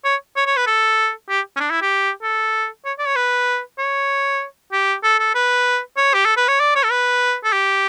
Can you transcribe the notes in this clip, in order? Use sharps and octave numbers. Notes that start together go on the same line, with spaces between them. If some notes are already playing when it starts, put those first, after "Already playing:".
C#5
C#5
C#5
B4
A4
G4
C#4
D4
E4
G4
A4
C#5
D5
C#5
B4
C#5
G4
A4
A4
B4
C#5
G4
A4
B4
C#5
D5
C#5
A4
B4
A4
G4